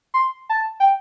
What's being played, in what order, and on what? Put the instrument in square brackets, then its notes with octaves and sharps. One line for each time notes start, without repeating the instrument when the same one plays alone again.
[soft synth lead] C6
A5
G5